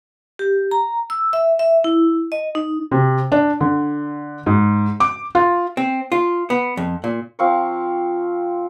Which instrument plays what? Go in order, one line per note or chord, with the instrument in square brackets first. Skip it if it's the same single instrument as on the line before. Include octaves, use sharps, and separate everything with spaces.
[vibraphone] G4
A#5
E6
E5
E5
E4
D#5
D#4
[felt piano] C3
D4
D3
G#2
D6
F4
[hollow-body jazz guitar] C4
F4
B3
F2
A#2
[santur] F3 C4 F5 C#6